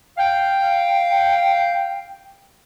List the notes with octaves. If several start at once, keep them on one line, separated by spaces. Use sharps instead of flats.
F5 G5